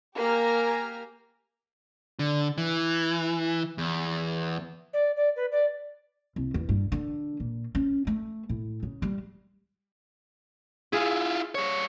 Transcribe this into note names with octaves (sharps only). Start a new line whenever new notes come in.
A#3 G4 G#5 A#5 F6
D3
E3
E2
D5
D5
B4
D5
C2
E2
G2
D3
A#2
C#4
A3
A2
C#3
G3
E4 F4 G#4
G3 C#5